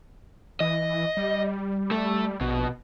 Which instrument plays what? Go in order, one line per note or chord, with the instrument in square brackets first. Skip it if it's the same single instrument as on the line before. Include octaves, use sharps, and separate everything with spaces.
[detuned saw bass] E3 [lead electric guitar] D#5
[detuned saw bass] G3
[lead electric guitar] A3
[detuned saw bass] A#1 [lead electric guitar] B2